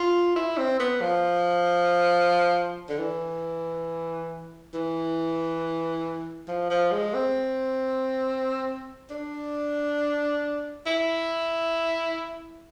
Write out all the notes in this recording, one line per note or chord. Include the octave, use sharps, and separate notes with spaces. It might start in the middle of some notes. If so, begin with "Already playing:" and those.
Already playing: F4
E4
C4
B3
F3
D3
E3
E3
F3
F3
G#3
C4
D4
E4